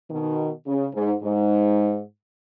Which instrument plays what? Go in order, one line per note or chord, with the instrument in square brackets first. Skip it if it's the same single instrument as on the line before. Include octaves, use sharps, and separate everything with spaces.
[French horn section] B2 D#3
C#3
G#2
G#2